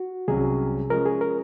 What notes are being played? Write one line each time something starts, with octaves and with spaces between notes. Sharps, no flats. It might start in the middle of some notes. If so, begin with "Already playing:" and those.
Already playing: F#4
C2 C3 F#3 C#4 G#4
F3 G#3 C#4 A#4
G#4
A#4